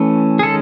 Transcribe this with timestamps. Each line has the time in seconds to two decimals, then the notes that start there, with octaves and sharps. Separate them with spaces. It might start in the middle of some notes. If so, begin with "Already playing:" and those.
Already playing: E3 A3 C#4
0.39 G#4
0.43 D#3 G#3 C#4 A4